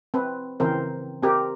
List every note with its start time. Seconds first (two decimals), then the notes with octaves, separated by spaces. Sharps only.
0.14 C4 B4
0.60 C#3 E3 C4 A#4 C5
1.23 C4 G4 A#4